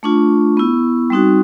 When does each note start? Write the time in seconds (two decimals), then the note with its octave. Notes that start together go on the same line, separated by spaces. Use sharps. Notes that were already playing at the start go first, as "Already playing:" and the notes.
0.03 A3 D4 F4 C#6
0.57 B3 E4
1.10 G3 C4 D#4 F#4